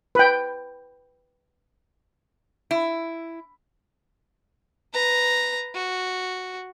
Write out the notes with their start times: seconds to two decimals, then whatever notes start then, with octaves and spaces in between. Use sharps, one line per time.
0.15 B4 G5
2.71 E4
4.93 B4 A#5
5.75 F#4